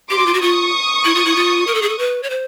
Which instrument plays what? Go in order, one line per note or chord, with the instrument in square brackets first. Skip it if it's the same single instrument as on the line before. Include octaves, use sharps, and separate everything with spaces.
[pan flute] G4 [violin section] C6 D6
[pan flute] F#4
F4
F#4
[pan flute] F4 [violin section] C#6 D#6
[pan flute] E4
F4
E4
F4
A#4
A4
G#4
A4
B4
C#5
C5